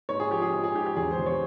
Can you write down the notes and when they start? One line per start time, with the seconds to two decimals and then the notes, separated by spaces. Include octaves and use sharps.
0.09 G#2 C#5
0.20 G#4
0.31 F3 G4
0.42 G#4
0.53 G#2 G#4
0.64 G#4
0.74 G#2 G4
0.86 G4
0.97 E1 G#4
1.11 C5
1.18 E2
1.26 C#5